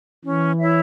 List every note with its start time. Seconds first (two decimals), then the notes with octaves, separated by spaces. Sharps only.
0.24 E3 C#4
0.58 E4 C#5 E5